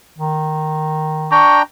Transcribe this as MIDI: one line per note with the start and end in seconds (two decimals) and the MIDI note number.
0.19 1.43 51
1.32 1.62 62
1.32 1.62 79
1.32 1.62 82
1.32 1.60 85